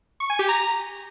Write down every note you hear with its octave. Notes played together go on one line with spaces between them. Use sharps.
C#6
G#5
G4
A#5